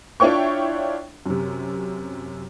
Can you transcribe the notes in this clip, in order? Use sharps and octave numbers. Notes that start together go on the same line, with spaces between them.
D4 E4 F4 C#5 G5 C#6
F#2 C3